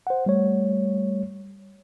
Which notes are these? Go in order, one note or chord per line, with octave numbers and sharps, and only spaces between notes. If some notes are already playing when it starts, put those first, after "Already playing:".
C5 F#5
G3 A3 C#5